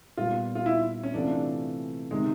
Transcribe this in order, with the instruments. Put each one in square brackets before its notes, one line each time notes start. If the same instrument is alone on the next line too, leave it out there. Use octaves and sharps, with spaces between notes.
[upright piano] A#2 G3 B3 [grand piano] F4
[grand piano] F4
E4
C#4
[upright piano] C3 E3 A3 C4 F4 [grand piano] D4
[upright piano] C3 D#3 [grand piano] G#3